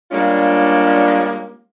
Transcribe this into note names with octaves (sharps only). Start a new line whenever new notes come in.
G3 G#3 A#3 C#4 D4 F4